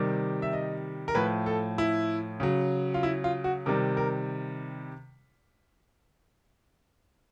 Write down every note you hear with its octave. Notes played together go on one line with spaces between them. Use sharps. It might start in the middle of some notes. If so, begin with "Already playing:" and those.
Already playing: C3 D#3 G3
E5
D#5
A#4
A2 F3 B4
A4
E4
C#3 F#3
F4
E4
F4
F#4
C3 D#3 G3 A#4
A#4